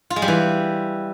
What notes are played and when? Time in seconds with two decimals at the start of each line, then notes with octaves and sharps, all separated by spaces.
0.10 F4
0.16 G#3
0.22 G3
0.28 E3